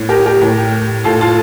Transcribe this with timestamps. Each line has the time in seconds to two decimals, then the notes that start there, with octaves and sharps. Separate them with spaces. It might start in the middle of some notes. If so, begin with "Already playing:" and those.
Already playing: A2
0.09 G4 A#4
0.25 G4 A#4
0.41 A2
1.04 A2 F4 A4
1.21 F4 A4